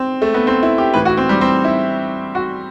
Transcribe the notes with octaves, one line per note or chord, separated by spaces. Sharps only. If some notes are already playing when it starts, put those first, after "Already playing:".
Already playing: C4
A3
B3
C4
E4
G4
A2 E3 B4
F#4
C4
G3
C4
E4
F#4